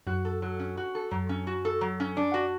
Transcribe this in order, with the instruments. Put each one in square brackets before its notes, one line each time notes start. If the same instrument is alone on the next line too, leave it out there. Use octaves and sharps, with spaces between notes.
[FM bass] F#2 [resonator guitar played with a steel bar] F#4
[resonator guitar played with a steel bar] A4
F#3
C#4
F#4
A4
[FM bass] F#2 [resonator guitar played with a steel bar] F#3
[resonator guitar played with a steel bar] C#4
F#4
A4
F#3
C#4
D4
F#4